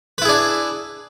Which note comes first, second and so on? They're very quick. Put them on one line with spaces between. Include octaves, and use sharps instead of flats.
B4 E4 G#4 D4